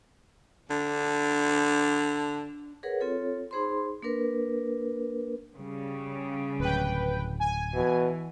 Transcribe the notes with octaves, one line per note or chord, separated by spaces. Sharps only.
D3 D4
G#4 A#4 B4 C#5 F#5
C4 F4 A4 C#5
D#4 G#4 C5 B5 C6
A#3 D4 A#4 B4
C#3 G3
D1 B4 G5
G#5
B2 E3